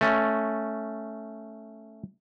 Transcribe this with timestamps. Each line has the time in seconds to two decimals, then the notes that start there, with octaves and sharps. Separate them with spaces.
0.01 A3 C#4